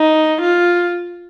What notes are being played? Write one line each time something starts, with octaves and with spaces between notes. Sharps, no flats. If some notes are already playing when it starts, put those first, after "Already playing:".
Already playing: D#4
F4